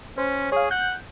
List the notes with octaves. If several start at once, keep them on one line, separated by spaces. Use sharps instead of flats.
C#4 C5
G#4 C#5 F5
F#5 G6